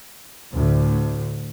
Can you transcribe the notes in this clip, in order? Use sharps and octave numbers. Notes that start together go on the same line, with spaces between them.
D2 A2